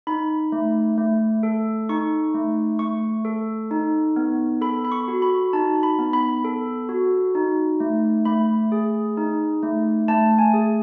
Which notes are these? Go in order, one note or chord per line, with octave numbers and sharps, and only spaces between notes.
D#4 B5
A3
A3
A4
D#4 C#6
A3
A3 C#6
A4
D#4
B3
A4 B5
B5
C#6
F#4
B5
D#4 A5
B5
B3
B5
A4
F#4
D#4
A3
A3 B5
G#4
D#4
A3
A3 A5
G#5
G#4